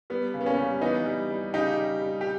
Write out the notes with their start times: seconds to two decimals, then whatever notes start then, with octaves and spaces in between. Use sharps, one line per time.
0.10 G3 B3
0.34 C#3
0.41 B3
0.46 A#3 C#4
0.58 G3
0.81 E3 B3 D#4
1.06 G3
1.30 G3
1.54 C#3 D#4 G4
1.78 G3
2.02 G3
2.21 G4